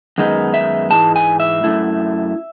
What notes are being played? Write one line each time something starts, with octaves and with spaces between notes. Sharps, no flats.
F#2 D#3 G#3 B3 D#4
E5
G#2 E3 G#3 A5
G#5
E5
F#2 E3 A3 E4